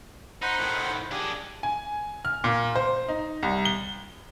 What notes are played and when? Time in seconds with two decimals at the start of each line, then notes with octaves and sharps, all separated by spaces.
0.42 D#4 C5 F#5 B5
0.60 A2 D#3
1.11 D4 G4 G#4
1.63 G#5
2.25 F6
2.44 A#2
2.76 C5
3.08 D#4
3.43 C2
3.65 G7